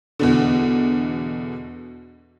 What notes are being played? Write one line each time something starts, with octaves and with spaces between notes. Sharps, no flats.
E2 B2 D3